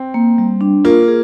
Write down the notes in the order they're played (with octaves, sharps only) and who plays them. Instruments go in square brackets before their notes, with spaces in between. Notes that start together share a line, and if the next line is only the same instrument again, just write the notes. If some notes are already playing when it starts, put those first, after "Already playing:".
Already playing: [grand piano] C4
[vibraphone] A#3
G3
D4
[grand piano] A#3 [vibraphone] F4
[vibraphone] G#4